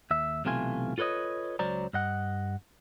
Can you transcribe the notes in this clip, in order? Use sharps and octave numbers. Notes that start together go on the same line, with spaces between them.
D#2 E5
B1 C3 E3 A3 F4 G#5
F4 A4 B4 C#5 D#5
C#2 F#3 C5 D5 A#5
G2 D#5 F#5